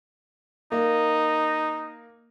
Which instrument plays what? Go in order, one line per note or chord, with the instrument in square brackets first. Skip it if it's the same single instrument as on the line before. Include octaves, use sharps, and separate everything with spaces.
[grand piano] A#3 [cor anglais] D#4